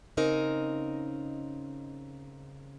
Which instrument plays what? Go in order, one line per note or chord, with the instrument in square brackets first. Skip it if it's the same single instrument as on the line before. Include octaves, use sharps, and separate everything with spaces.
[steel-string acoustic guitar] C#3 C4 D#4 A#4 D#5